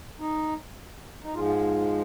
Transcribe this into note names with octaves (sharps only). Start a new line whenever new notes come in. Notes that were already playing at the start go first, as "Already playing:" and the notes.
D#4
D#4
G#2 F3 G#3 F4
F4